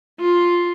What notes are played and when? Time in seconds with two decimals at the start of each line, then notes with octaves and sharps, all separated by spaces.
0.21 F4